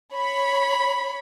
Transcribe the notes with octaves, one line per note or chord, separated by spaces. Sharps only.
C#5 B5